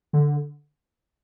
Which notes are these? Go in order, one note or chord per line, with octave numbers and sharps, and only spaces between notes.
D3